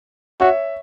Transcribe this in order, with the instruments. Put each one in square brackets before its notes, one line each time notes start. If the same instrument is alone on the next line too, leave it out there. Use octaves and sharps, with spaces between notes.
[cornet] F#4 [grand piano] C#5 E5